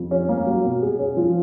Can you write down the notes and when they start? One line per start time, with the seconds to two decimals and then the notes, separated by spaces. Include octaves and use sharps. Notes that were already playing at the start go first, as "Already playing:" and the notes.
Already playing: F2
0.11 C#4
0.29 A#3
0.46 F#3
0.64 B2
0.82 G#4
0.99 C#4
1.17 F3